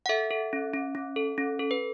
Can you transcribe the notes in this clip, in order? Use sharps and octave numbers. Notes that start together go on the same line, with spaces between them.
F#5
A4 E5
A4
C#4
C#4
C#4
A4
C#4
A4
B4